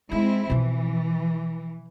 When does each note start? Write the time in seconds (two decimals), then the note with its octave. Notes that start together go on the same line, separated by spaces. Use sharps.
0.12 G#3 C4 D#4 E4
0.50 B2 E3 F3